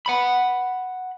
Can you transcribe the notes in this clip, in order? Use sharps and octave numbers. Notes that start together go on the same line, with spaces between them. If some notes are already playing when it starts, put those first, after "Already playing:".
F#5 B5